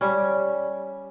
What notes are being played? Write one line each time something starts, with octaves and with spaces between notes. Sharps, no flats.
G3 C#4